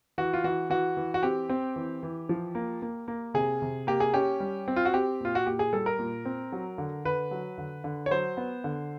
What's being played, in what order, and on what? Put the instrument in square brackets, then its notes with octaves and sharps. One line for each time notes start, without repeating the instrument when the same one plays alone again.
[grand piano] E3 F#4
F4
E3 F#4
E3 F#4
E3
F#4
C4 G4
C4
E3
E3
F3
A#3
A#3
A#3
C3 G#4
C3
A#3 G4
G#4
C#4 G4
G3
C4
F4
F#4
C4 G4
A#2 F4
F#4
A#2 G4
G#4
G3 A4
A#4
A#2
C4
F#3
D3
D3 B4
F#3
D3
D3
C#5
F#3 C5
B3
D3